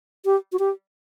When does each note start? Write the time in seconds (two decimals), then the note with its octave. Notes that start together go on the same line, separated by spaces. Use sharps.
0.25 G4
0.52 F#4
0.59 G4